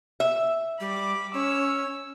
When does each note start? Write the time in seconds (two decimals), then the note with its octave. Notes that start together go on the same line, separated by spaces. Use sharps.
0.20 E5
0.80 G3 B5 D6
1.34 C#4 C#5 E6